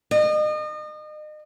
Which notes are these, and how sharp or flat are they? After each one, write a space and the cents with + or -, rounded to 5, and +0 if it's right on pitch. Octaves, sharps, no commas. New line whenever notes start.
D#5 -35